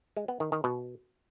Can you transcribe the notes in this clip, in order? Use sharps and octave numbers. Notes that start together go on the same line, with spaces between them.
G#3
B3
D#3
D#3
B2